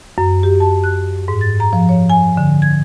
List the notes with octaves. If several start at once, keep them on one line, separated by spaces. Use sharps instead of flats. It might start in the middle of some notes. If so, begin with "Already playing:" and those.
F#2
G4
A5
F#6
G#2
A6
A#5
F3
C#5
G#5
D3
G#6